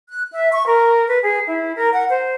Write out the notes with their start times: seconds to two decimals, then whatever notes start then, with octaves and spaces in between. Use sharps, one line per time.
0.09 F#6
0.31 E5
0.53 C#6
0.67 A#4
1.06 B4
1.24 G#4
1.47 E4
1.77 A#4
1.93 F#5
2.10 C5